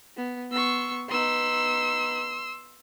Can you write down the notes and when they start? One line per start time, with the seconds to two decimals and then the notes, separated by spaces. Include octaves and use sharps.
0.17 B3
0.52 B3 C6 C#6 E6
1.09 B3 D#4 C6 E6